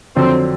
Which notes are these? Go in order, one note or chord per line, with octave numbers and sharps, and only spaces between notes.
F2 D3 F#3 C4